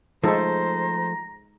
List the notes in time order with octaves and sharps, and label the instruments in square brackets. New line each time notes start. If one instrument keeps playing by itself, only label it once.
[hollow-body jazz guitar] F3 A3 [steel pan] G#3 D#4 A4 [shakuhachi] C5 [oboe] A#5